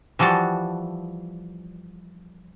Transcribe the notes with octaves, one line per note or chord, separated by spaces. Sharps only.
E3 F3 G3 F#4 A5